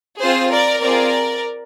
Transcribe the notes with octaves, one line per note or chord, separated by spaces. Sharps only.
C4 F4 G#4 C5
A#4 D5
C4 F4 G#4 A#4 D5